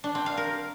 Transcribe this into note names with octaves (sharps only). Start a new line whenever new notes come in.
D4
C4
F5
A#4